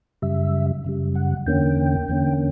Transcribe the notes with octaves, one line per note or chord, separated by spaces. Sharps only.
F#2 C#3 G3 E5
F#2 C#3 G3
F#5
E2 D3 A#3 C#4 G5
E2 D3 A#3 C#4